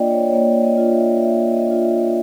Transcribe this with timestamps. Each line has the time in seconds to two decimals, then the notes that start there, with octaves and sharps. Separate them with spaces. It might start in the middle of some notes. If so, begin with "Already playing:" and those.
Already playing: A#3 D4 F4 D5 D#5 G5
0.11 C#5
0.28 C#5
0.32 A#3 D5
0.63 D#5
0.78 D4 F4
0.92 E5
1.22 A#3 E5
1.52 D#5
1.67 D4 F4
1.82 E5